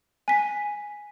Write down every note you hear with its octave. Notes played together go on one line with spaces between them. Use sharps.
G#5 B6